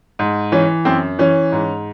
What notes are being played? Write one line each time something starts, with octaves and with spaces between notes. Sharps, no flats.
G#2
E3 C#4
F#2 C4
E3 C#4
G#2